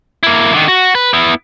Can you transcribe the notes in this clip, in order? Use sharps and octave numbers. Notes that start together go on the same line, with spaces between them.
A#3 E4
D3 D#3
F#4
B4
B3 E4